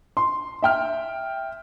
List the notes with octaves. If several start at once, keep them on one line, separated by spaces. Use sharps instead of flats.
C6
E5 G5 F6